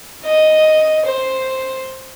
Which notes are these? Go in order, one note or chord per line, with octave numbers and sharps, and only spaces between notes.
D#5
C5